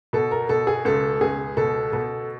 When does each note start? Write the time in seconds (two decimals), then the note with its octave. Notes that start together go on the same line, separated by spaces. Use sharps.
0.13 B2 A4
0.31 A#4
0.49 B2 A4
0.67 G#4
0.85 C#2 A4
1.21 C#2 G#4
1.57 B2 A4
1.93 B2 A4